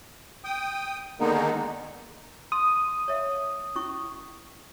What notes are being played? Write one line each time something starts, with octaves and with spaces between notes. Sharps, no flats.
G5 D#6
D3 D#3 G#3 A#3 B3 D#4
C6 D#6
C#5 E5 F5
C#4 E4 C#6